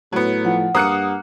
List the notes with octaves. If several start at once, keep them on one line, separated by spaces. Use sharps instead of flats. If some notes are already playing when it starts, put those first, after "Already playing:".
A2 F#3 B3
F3 F#5
G2 A#3 D#6 F#6 C#7